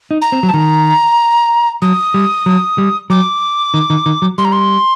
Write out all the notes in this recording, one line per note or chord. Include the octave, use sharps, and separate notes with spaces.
D#4
A#5
C4
F#3
A5
D#3 A#5
F#3 D#6
G3
F#3
G3
F#3 D6
D#3
D#3
D#3
F#3
G3 C6
A#5
C6